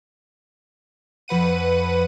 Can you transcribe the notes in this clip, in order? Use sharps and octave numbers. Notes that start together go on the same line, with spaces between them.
F2 B4 F#5 D#7